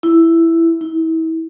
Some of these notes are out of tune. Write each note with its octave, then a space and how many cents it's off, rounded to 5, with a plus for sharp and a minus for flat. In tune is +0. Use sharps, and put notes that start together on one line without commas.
E4 +5
E4 -35